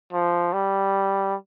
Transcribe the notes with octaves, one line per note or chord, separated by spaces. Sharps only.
F3
G3